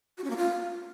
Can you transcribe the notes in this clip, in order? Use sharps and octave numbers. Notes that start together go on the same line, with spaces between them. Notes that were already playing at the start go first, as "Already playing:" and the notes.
F#4
C#4
A#3
F4